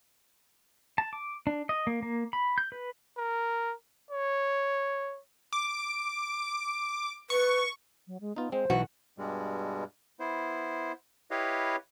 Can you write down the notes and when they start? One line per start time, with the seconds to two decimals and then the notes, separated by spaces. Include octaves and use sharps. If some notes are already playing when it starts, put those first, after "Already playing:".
0.98 A5
1.13 D6
1.47 D4
1.69 D#5
1.87 A#3
2.03 A#3
2.33 B5
2.58 G6
2.72 B4
3.18 A#4
4.11 C#5
5.53 D6
7.30 B4 C#6
8.07 F#3
8.21 G#3
8.36 B3 D#4 F4
8.52 G#3 C4 C5
8.70 B1 B2 E3 F#4
9.18 G2 B2 G3 G#3
10.20 B3 E4 C5
11.31 E4 G4 B4 C#5 D#5 F5